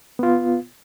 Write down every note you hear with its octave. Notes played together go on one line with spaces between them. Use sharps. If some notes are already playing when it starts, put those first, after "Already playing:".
B3 F4